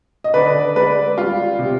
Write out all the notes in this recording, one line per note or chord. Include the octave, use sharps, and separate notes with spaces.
D#5
D3 B4 D5
G#3 B4 D5
G3 F4
C3